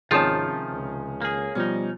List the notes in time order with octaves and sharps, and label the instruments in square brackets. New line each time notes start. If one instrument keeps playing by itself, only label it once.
[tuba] G#1 [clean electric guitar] C3 A5 [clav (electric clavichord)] D#3 F3 F4 [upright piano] G#3 C#4
[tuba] C#2
[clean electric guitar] A#3 G#4
[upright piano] B2 F3 [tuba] G3 [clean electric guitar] C#4 D#4